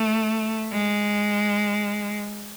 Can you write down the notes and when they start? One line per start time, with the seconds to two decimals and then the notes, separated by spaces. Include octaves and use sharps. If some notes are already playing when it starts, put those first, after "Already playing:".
Already playing: A3
0.72 G#3